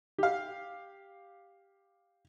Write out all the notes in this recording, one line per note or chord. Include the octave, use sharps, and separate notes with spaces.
G4 F5